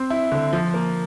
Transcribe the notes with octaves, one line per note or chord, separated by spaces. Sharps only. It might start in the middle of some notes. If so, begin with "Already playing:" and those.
Already playing: C4
E4
D3
F3
A#3